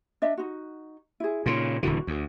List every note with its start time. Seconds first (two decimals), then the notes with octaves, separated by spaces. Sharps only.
0.22 D4 D#5 E5
0.37 D#4 F#4
1.20 E4 G#4
1.46 A#2 C#3 D#4 F4
1.83 D#1 D3 E3 F#4
2.07 D2